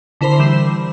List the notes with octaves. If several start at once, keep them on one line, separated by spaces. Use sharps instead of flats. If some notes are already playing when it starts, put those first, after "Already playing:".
D3 E4 A#4 C5 B5 C7
E3 G3 E7